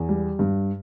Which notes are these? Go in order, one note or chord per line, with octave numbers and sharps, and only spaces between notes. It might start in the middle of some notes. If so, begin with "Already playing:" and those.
Already playing: E2
G3
G2